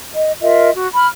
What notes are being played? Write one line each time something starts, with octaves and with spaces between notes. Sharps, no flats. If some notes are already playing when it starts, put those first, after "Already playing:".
D#5
F4 A#4 D#5 E5
F#4
B5 F6